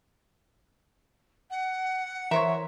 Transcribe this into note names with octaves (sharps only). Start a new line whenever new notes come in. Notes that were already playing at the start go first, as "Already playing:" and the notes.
F#5
E3 A#4 C5 C#5 E5